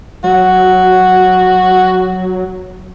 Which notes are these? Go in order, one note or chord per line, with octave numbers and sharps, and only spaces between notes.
F#3 F#4